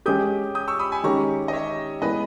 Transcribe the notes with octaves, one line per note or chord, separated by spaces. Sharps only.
G#3 C#4 G4 D#6 G6
D#6 G6
C#6 E6
B5 D#6
G#5 B5
D#3 G#3 C#4 G4 A#5 C#6
D#5
C#5 E5
G#3 B3 E4 B4 D#5